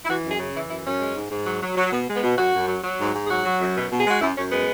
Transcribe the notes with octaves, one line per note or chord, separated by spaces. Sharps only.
E4
E3 F#4
F#2
G#4
C#3
E3 E4
F#2 E4
F#2 C#4
G#3
G#2
G#2
F#3
F#3
F#3
B2 B3
G#3
B3
B2
F#2 F#4
F#2
F#3
F#3
G#2
G#2
G#4
F#3 F#4
F#3
F#2
B2
B2
G#4
G#3 F#4
F#2 E4
F#2 C#4
G#3 B3